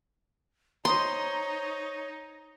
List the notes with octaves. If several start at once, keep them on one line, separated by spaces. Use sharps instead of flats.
D#4 C5 C#5 D#5 A#5 C6